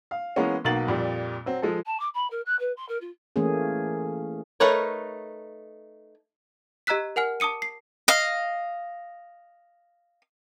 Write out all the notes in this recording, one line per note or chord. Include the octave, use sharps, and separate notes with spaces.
F5
E3 G#3 A#3 B3 C#4
B1 B2 A#3 A6 F#7
F2 A#2 G3
F#3 C4
F3 G#3 A4
A5
D6
B5
A#4
F#6
B4
C6
A#4
F4
E3 A3 A#3 C#4 G#4
A3 D#4 A#4 B4 C#5
G4 D#5 A#5 E6 F#6 B6
A#4 F#5 G#5 F6
A5 D6 D#6 C#7 D#7
C7
D#5 F5